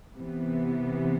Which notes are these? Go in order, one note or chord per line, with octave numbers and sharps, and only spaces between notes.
C3 E3 B3